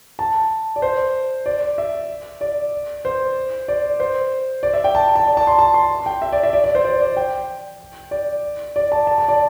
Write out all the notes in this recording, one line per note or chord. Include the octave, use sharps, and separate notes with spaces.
A5
D5
C5
D5
E5
D5
C5
D5
C5
D5
E5
G5
A5
A5
D5
A5
C6
A5
C6
G5
E5
D5
E5
D5
D5
C5
D5
D5
G5
D5
D5
A5
A5
A5
D5